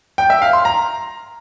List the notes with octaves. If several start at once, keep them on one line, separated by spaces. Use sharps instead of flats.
G5
E5
F5
C6
A#5